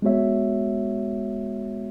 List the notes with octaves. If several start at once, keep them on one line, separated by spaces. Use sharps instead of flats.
G#3 B3 F#4 C#5 E5